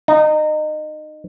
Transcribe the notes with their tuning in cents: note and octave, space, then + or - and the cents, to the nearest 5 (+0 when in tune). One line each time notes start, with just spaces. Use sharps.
D#4 -25